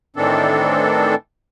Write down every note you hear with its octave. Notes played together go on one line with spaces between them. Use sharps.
A2 D#3 E3 C4 D4 A4